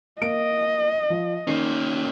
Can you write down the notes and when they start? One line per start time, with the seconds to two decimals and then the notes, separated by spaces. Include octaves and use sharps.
0.21 A#3 D#5 D7
1.10 F3
1.47 D#3 A#3 C#4 A#4 C7